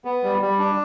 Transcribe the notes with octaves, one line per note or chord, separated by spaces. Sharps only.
B3
G3
G3
D4